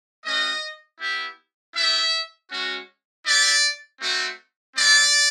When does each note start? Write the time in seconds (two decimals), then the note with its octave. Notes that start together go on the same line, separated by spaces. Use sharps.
0.25 A3 C#4 F#4 D#5
1.00 B3 E4 G4
1.75 B3 E4 G4 E5
2.51 G#3 C#4 F#4
3.25 B3 E4 G4 D5
4.00 A3 C4 D#4 F#4
4.76 G#3 C4 E4 D5